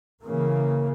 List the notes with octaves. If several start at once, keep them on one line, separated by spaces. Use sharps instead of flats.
C#3 E3 A#3